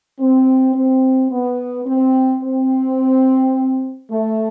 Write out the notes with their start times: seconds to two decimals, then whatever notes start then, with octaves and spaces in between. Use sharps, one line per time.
0.20 C4
0.75 C4
1.30 B3
1.86 C4
2.42 C4
4.10 A3